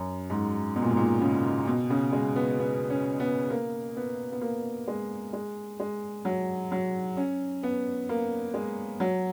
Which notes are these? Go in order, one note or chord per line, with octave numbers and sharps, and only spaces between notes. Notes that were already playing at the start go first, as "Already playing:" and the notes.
Already playing: F#2
G#2
B2
A#2
G#2
A#2
C#3
B2
C#3
G#3
B3
B3
C#4
B3
A#3
B3
B3
A#3
G#3
G#3
G#3
F#3
F#3
C#4
B3
A#3
G#3
F#3